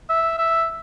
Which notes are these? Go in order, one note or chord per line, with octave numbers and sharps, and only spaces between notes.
E5
E5